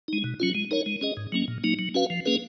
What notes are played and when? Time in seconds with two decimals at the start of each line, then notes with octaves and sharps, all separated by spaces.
0.08 G#3 D#4
0.24 B2
0.40 F#3 C#4 F4
0.55 G#3
0.71 D#4 A#4 C#5
0.86 G#3
1.01 C#4 G#4 D#5
1.17 G#2
1.32 F#3 A#3 C#4
1.48 A#2
1.64 F#3 A#3 D#4
1.79 F#3
1.94 C#4 F#4 B4 F5
2.10 F3
2.26 A#3 C#4 G#4 B4